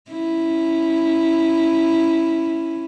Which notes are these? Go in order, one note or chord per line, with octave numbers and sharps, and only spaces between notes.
C#4 E4